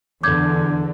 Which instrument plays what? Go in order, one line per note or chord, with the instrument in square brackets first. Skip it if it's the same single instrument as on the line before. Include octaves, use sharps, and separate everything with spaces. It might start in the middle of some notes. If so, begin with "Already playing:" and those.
[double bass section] E2 D3 [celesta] D6 G6 G#6